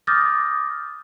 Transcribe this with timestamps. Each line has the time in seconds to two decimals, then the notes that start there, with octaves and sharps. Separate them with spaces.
0.07 D6 D#6 F6 G6 A6 A#6